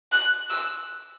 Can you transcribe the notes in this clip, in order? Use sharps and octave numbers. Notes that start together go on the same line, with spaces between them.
F#6
E6